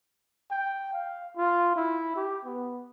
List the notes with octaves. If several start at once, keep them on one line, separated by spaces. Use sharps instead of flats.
G5
F5
F4
E4
G4
B3